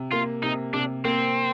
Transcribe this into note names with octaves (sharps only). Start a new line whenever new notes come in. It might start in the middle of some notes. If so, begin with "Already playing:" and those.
Already playing: C3
A#3 F4
C3 D#4
C3 D4
A#3 C4